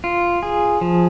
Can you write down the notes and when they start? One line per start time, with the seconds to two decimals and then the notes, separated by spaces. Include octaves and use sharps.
0.04 F4
0.43 G#4
0.81 F3